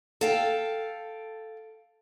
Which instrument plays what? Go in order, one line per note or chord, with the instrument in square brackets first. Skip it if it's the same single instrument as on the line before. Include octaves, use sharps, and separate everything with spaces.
[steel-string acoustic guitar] A4 F5 G5